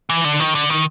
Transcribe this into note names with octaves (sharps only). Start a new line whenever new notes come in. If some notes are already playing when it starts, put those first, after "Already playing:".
E3
D3
D#3
D3
D#3